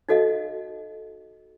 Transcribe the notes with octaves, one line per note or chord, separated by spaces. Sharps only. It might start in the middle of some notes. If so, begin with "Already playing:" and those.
D#4 F#4 A4 D#5 F5